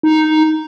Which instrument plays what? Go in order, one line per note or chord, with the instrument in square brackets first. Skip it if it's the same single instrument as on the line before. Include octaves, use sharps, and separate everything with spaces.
[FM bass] D#4